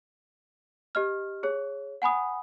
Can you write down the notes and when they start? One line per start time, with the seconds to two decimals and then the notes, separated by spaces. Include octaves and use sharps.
0.95 G4 D#5 F6
1.43 G#4 C#5
2.02 F#5 G#5 B5 D#6